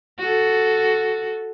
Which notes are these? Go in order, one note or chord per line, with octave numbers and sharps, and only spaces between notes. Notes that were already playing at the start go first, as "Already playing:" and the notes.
F#4 A4